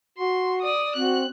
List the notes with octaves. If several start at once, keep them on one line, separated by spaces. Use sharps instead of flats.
F#4 C6
D5 D#6
C4 F#4 F#6